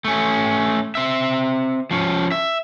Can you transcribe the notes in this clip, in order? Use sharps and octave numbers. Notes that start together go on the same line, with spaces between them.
A3 C#4
C4 E5
F3 C#4
E5